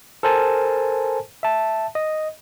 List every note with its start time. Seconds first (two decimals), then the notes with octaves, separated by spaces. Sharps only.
0.23 A4 A#4 C5 G#5 A5
1.43 E5 A5
1.95 D#5